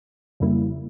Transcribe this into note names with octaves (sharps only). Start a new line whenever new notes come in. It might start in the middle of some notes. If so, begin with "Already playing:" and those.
F2 C#3 G3 A#3 E4